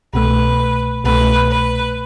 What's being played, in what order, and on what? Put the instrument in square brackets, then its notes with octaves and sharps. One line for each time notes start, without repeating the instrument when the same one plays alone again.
[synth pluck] C2 B2 A3 [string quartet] B4
[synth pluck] C2 B2 A3 [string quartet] B4
[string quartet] B4